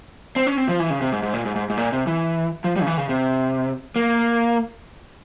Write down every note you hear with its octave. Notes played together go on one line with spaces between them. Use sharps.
C4
C#4
C4
F3
E3
C#3
C3
G#2
G#2
A#2
G#2
G#2
G#2
A#2
C3
E3
F3
G3
C#3
E3
C#3
C3
A#3